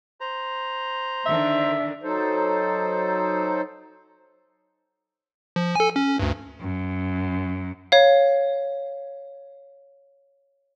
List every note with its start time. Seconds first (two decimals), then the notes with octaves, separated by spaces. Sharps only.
0.21 C5 A#5
1.26 D3 D#3 D4 E5
2.01 F#3 D#4 A4 C5
5.56 F3
5.76 A4 G#5
5.96 C#4
6.19 D2 G2
6.60 F#2
7.92 C#5 F5